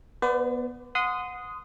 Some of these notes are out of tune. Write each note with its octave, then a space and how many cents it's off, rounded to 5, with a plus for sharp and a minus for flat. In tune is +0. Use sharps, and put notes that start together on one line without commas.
B3 -15 B4 +45 D5 +0
F#5 -25 C6 -25 D#6 +0